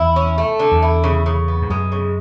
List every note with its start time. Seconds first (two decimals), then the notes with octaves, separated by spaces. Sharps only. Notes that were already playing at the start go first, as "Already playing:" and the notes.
Already playing: E2 E4
0.16 C#4
0.38 A3
0.60 D3
0.72 E2
0.82 E4
1.04 C#3
1.26 C#3
1.48 B3
1.62 G#2
1.70 F#2 G#3
1.92 C#3